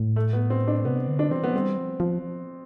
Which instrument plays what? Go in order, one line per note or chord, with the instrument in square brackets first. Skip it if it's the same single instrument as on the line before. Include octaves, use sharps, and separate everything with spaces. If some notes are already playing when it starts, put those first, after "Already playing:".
Already playing: [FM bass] A2
[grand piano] A3
B3
C4
D4
[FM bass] C3 [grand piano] B3
[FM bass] D3
[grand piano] D4
[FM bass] E3 [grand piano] C4
[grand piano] B3
[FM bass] G3 [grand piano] C4
[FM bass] F3
F3